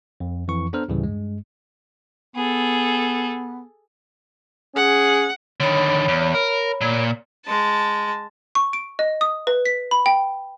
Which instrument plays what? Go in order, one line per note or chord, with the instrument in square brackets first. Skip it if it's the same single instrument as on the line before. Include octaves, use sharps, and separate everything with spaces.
[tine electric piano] F2
F2 E3 C#6
B3 D4 A4 C5 A#5 F6
D2 A2 C#3 E3 G3
G2 G#3
[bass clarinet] B3 [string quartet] G#4 A4
[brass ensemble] C#4 G#4 [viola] F#5
[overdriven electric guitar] D3 D#3 [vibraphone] C#5 B5
[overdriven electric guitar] E2
A#4
A#2
[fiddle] G#3 A5
[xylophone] C#6
D7
D#5
D#6
B4
B6
B5
G5